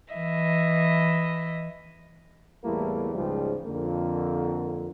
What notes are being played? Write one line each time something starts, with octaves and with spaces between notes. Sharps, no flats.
E3 D#5 E5
E2 A2 G3 A3 A#3 E4
C#2 G#2 C#3 F3 G3
F2 D3 A#3